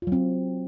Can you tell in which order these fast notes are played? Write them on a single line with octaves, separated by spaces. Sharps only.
F4 F#3 C4